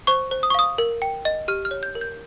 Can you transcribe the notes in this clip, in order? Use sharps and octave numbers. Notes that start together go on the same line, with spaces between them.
C5 C#6
C5
D#6
C#6
F5 D#6
A#4
G5
D#5
G4 F6
F6
C#5
G6
A#4
G6